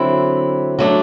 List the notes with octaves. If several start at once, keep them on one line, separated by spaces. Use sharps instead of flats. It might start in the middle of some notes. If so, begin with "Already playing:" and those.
Already playing: D3 F#3 C4 E4
F#3 A3 D4